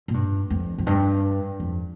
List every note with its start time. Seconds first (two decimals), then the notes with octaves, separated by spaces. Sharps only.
0.08 A#2
0.14 G2
0.50 F2
0.78 F2
0.87 G2
1.60 F2